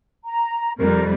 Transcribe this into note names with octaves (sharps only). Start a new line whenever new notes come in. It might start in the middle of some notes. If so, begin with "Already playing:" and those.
A#5
F2 C3 G3 A#4